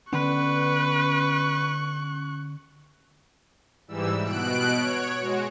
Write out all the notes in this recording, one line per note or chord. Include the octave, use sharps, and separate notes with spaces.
D3 B3 C#4 B4 C#6 F#6
G#2 E3 G3 E6
B2 F#6 D7
C#5
G#3 F#4